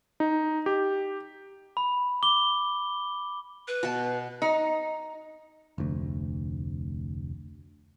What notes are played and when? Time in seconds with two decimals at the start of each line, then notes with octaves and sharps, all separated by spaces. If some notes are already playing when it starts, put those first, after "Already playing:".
0.20 D#4
0.66 G4
1.77 B5
2.23 D6 G7
3.68 B4
3.83 B2 A5
4.42 D#4
5.78 F1 D2